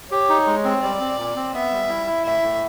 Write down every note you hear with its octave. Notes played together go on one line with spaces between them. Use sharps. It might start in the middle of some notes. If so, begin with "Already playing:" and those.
G4 C#5
D#4
G#3
C4
G3 D5
C4
A#2
C4
B3 E5
G3
E4
E4
A2 E5
A2